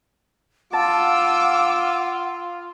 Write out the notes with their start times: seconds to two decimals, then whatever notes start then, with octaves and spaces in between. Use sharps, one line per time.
0.73 F4 F#5 A5 D6 E6